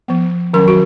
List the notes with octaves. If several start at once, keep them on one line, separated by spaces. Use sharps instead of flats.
F3 B3
D#3 F#3 C#4 A#4
F#4